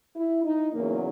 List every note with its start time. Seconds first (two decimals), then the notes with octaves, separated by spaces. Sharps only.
0.15 E4
0.44 D#4
0.73 E2 C#3 F#3 A#3